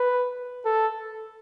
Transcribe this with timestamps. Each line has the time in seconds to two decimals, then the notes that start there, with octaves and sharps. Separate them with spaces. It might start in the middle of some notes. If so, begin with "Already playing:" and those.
Already playing: B4
0.65 A4